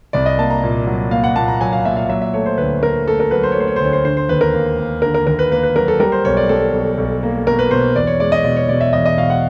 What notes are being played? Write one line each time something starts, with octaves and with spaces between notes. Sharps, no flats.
C2 D5
D#5
A#3 A5
A#5
A#2
F#3
A#3 F5
F#5
A#2 A5
A#5
F#3 G#5
F5
A#2 E5
F5
F#3 E5
E5
A3 C#5
C5
D2 B4
A3 A#4
A3 A4
A#4
F#3 B4
C5
C#5
A3 C5
C#5
C5
D2 C#5
C5
D3 C5
C5
D#2 B4
A#4
A#3
A#3
D3 A#4
A#4
D#2 A#4
B4
A#3 B4
B4
F#3 A#4
A4
G3 A#4
C5
B1 C#5
D5
G3 A4
B1
B1
A#3
B2 A#4
B4
B2 C5
E2 D5
C#5
G#3 D5
D#5
B2 D5
C#5
B2 D5
E5
E2 D#5
D#5
B2 F5
F#5